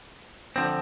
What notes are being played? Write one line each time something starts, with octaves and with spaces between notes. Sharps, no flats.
D3 F3 C4